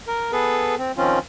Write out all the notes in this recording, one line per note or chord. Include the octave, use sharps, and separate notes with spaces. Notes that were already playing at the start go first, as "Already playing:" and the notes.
A#4
B3 G#4 A4 B4
C4
D#3 F3 C4 C#4 F4